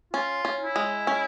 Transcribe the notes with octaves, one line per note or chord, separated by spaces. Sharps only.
C#4 F4
C#4
E4
G#3
C#4